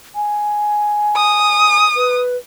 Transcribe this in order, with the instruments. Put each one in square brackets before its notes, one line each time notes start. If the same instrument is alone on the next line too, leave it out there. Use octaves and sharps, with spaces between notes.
[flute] G#5
[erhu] D#6
[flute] B4